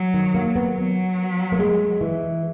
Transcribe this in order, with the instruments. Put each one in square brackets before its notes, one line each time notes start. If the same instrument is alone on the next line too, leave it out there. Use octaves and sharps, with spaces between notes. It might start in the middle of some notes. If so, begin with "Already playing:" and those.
Already playing: [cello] F#3
[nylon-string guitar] D#3
A#3
B3
[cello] F#3
[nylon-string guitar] A#3
G#3
E3